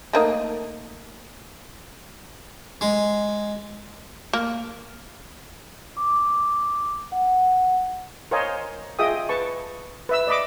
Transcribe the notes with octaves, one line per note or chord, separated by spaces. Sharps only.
A3 A#3 D#4
G#3
A#3
D6
F#5
A#4 C5 C#5 D#5 F5 G#5
F4 G#4 D#5 E5 G5 D#6
B4 A5 C#6
B4 E5 E6
D5 D#5 B5 D6